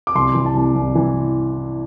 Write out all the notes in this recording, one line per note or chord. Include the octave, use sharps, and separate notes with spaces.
D6
C2 C6
E3
A5
C2
C2
E3